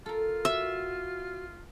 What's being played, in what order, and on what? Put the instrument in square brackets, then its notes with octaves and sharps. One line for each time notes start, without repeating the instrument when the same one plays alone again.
[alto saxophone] F4 [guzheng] A4 A#4
[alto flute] F#4 [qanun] E5